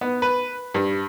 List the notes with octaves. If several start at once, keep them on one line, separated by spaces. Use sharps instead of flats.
B3
B4
G2